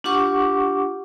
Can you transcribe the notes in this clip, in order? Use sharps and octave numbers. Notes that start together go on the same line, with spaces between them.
D4 F4 G4 F#5 C#6 D6